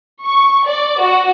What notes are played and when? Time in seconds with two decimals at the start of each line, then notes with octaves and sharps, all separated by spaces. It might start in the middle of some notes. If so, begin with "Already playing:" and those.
0.24 C#6
0.66 D5
1.01 F#4